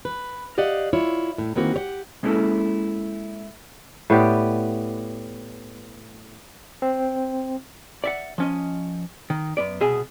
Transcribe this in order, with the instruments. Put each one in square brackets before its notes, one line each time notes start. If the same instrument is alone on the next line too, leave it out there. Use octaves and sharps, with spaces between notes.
[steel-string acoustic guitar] B4
G4 D5 D#5 F5 F#5
E4 F4 C#5
A2
D#3 E3 A#3 C4 F#4
G4 C#5 F#5
[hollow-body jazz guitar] G#3 A#3 C#4 E4 A4
[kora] A2 B3 G4 D5
[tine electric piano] C4
[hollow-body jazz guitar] D5 E5 F#5
F3 C#4 D#5
D#3
F#2 B3 D5
C2 B2 G#4 E5